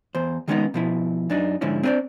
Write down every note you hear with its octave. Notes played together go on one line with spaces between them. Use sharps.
E2 C5
D#3 G3 G#3 B3 C#4 D#4
B2 F3 E4
F#2 D4 D#4
G#2 D3 F3 C#4 E4
C4 D4 F4 B4 C5 D5